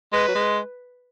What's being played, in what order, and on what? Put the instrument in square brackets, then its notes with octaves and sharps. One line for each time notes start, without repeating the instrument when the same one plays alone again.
[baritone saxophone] G#3 [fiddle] B4
[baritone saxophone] F#3
G#3